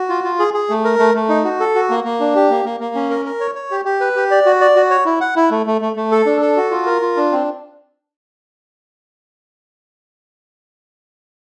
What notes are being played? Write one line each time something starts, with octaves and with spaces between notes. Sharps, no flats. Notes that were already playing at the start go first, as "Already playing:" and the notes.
Already playing: F#4
F4
F4
G#4
G#4
A3
A#4
A3
A3
D#4
F#4
A4
F#4
A#3
A#3
D4
G4
A#3
A#3
A#3
C#4
A#4
A#4
C#5
C#5
G4
G4
B4
G4
D5
F#4
D5
F#4
C#5
E4
F#5
E4
A3
A3
A3
A3
A4
D4
A4
F#4
F4
A#4
F4
D4
C4